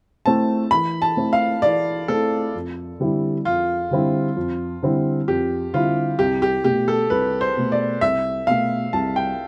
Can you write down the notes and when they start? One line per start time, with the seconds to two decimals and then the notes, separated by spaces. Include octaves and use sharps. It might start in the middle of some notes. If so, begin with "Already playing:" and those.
0.25 A3 C4 E4 A5
0.71 E3 B5
1.02 A5
1.17 A3 C4 E4
1.33 F5
1.62 E3 D5
2.08 A3 C4 E4 A4
2.54 F2
3.00 D3 G3 C4 E4
3.45 F2 F4
3.91 D3 G3 C4 E4
4.36 F2
4.83 D3 G3 C4 E4
5.28 F2 G4
5.73 D3 G3 C4 E4 F4
6.19 C2 G4
6.42 G4
6.64 B2 A3 G4
6.88 A4
7.10 C2 B4
7.41 C5
7.57 B2 A3
7.72 D5
8.01 C2 E5
8.47 B2 A3 F5
8.93 C2 A5
9.16 G5